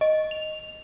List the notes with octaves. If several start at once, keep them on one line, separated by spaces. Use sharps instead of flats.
D#5
F7